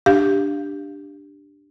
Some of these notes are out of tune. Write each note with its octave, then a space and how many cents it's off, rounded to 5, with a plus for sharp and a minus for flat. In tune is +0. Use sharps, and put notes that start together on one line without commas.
D4 +0 G4 +5 F5 +0